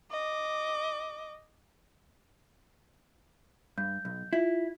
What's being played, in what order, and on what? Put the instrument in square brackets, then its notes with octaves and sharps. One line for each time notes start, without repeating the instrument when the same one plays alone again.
[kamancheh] D#5 D6
[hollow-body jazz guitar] G2 [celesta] G6
[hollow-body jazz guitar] B1
[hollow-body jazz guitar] E4 [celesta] F4